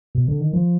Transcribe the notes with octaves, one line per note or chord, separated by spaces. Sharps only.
B2
D3
D#3
F3